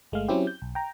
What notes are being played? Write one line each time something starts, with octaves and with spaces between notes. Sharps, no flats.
G1 G#3 A3 F5
F#3 C4 C#4 E4 G4
G6
B1
G5 A#5